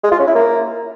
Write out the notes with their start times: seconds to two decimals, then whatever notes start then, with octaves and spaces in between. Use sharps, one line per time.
0.03 G#3
0.11 F4
0.19 C#4
0.27 E4
0.35 A#3